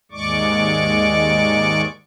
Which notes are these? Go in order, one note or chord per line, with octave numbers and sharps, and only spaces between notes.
D#2 G#2 G#3 D5 C#6 D6